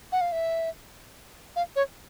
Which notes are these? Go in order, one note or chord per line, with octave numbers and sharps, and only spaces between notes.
F#5
F5
E5
F5
C#5